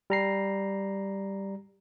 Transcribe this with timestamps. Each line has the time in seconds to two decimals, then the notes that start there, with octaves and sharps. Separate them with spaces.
0.10 G3 A#5 C7